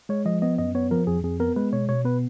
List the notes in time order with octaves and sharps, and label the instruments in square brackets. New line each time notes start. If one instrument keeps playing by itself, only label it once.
[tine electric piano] G#3 C#5
F3 D#5
B3 D#5
F#2 D#5
B3 C#5
F3 A#4
F2 G#4
F2 G#4
B3 A#4
G#3 B4
B2 C#5
B2 C#5
B3 B4